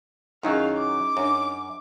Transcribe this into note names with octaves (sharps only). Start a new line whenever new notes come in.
F#2 D#3 F#3 C#4 D#4 E4 G#4 F5
D6
F#2 D4 C#5